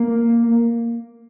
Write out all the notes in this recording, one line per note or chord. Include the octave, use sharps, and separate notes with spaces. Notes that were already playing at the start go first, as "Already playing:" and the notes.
Already playing: A#3